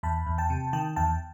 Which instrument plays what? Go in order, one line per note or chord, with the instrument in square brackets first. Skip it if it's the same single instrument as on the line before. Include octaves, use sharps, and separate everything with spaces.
[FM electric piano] E2 A5 B5
E2
G5 A5
C3
D#3 G5 A5
E2 G5 A5